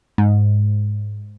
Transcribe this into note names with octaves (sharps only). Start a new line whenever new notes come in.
G#2